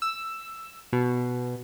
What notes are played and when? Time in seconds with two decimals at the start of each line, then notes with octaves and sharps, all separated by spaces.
0.02 E6
0.93 B2